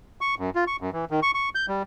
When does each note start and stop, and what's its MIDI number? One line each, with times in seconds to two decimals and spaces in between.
0.21 0.35 85
0.39 0.50 42
0.55 0.64 65
0.67 0.76 85
0.81 0.90 42
0.93 1.05 52
1.11 1.20 51
1.23 1.31 85
1.34 1.49 85
1.55 1.66 91
1.68 1.83 55